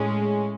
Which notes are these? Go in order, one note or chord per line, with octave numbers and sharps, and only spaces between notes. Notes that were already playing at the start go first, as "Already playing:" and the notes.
Already playing: A2 G#3 C#4